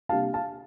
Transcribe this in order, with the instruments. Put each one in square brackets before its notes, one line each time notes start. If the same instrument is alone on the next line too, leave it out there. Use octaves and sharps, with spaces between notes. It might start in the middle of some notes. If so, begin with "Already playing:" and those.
[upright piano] C3 G3 A#3 D4 F5 A5
F5 A5